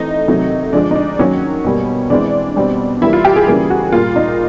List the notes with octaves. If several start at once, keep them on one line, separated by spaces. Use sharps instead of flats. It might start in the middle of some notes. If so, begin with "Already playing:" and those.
Already playing: E3 A3 C4 D#4
C3 D#3 F#3 A3
D3 F3 G#3 D4
D#4
D4
D#3 F#3 A#3 C#4
B2 G3 A#3
E3 G#3 C4 D4
B2 G3 C4
E3 G3 A#3 E4
F4
G4
G#4
C#3 E3 G3 A#3 G#4
F#4
A#2 G3 A#3 F4
D#4